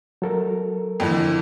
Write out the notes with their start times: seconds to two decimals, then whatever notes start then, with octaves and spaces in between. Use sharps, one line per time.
0.22 F#3 A4 A#4
1.00 F2 D3 E3